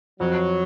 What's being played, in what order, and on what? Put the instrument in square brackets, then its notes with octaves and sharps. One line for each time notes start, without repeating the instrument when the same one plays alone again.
[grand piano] F2 [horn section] F#3